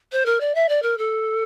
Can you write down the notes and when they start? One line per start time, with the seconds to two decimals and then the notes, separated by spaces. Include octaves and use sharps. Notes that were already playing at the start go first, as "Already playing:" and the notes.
0.12 C5
0.25 A#4
0.40 D5
0.54 E5
0.68 D5
0.82 A#4
0.97 A4